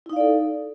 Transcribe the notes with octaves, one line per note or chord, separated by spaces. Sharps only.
D#4 E4 A4 D5 F5